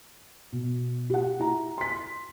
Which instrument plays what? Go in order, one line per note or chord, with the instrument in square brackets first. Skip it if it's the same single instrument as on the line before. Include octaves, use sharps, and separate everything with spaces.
[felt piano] B2
G4 F#5
E4 A#5
C6 B6